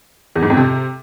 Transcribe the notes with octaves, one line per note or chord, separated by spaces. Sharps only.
E2
G#2
F2
C3